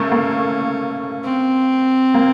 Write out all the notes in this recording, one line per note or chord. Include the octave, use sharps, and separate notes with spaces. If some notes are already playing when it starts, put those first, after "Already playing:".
Already playing: A3 A#3 C#4
A#3
C4
A#3